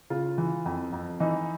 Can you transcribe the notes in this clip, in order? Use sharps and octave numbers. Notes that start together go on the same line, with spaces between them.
C#3 F4
E3
F2
F2
E3 D#4